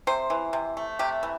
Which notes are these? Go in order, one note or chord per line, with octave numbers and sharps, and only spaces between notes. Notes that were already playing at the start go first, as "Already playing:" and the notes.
C3 C5
E3
C3
A3
C3 G4
E3